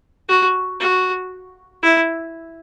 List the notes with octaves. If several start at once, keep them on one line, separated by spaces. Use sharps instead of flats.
F#4
F#4
E4